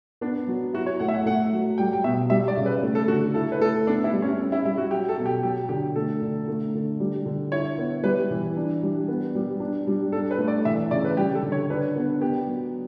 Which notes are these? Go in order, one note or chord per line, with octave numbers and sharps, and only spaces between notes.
B3 D4
F#3
E4 F#4
C#5
A3 F#5
E5
F#5
A3 F#5
F#3
G3 G5
G5
B2 E5
G3 E5
D5
C#3
B4
A3
A4
D3 F#4
E4 A4
B4
A3 A4
B3 D4
E4
G3
C#4
C#4
E4
G3 E4
F#4
F#3 G4
A4
B2
G4
F#3 G4
D3 G4
A3 A4
D3
A3
D3
G3
D3
E4 C#5
B3
G3 B4
E3
D4
G3
B3
G3
D4
G3
D4 A4
B4
A3
D5
E3 E5
C#3 D5
B4
G3 G4
A4
D3
C#5
D4 B4
B3
B3 G4
F#3